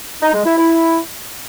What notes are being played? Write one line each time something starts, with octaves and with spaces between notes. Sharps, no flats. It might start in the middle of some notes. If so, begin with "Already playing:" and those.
D#4
G#3
E4
E4